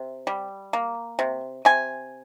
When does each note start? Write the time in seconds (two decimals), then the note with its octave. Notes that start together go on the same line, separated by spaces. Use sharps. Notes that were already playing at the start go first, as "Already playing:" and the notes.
Already playing: C3
0.27 G3
0.73 A#3
1.19 C3
1.65 C3 G#5